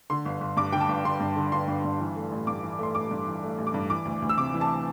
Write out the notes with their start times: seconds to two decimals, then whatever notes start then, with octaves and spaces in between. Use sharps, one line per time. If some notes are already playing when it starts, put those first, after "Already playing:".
0.10 D3 C6
0.25 G1
0.41 G1
0.57 G2 D6
0.72 D3 G5
0.81 A5
0.89 G1
1.05 G1 C6
1.20 G2
1.36 D3
1.52 G1 C6
1.68 G1
1.84 G2
2.00 E3
2.16 A3
2.32 A1
2.47 G2 D6
2.63 E3
2.79 A3 C6
2.95 A1 D6
3.11 G2
3.27 E3
3.43 A3
3.58 A1
3.67 D6
3.74 G2
3.90 E3 D6
4.05 D2
4.22 D2
4.29 E6
4.37 C3 D6
4.54 E3
4.61 A5